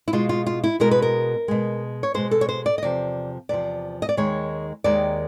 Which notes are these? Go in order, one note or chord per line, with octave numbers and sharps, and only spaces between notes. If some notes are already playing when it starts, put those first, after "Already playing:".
E4
B2 G#3 F4
F4
F4
E4
B2 G#3 A#4
B4
A#4
B2 G#3
C#5
B2 G#3 C5
A4
C#5
C5
D5
D#5
E2 C3 F3 D5
E2 C3 F3 D5
D#5
D5
D#2 D#3 G#3 C#5
D#2 D#3 G#3 D5